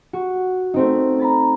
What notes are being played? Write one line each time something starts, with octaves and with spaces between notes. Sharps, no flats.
F#4
A3 C4 D#4
A#5 B5 A6